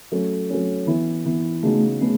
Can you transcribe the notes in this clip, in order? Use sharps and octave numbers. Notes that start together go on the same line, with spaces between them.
F#3 A3 C#4
F#3 A3 C#4
E3 B3 E4
E3 B3 E4
C#3 G#3 A3 B3 D#4 F#4
C#3 G#3 A3 B3